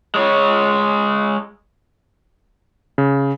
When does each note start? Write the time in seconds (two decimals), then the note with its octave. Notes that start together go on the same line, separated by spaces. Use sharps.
0.15 G#3 C#5
2.98 C#3